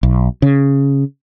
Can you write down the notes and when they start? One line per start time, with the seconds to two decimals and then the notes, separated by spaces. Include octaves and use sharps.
0.03 B1
0.42 C#3